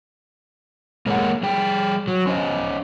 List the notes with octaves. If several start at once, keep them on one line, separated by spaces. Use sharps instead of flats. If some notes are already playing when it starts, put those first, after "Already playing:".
G#3 A#3 C#4 G#4 A4 F#5
G3 G#4 G5
F#3
C#4 C5 D#5